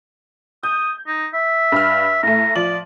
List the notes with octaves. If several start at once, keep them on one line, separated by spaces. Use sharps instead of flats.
D#6 G6
D#4
E5
G2 F6
A2 A3 A#5
F3 D5 F#7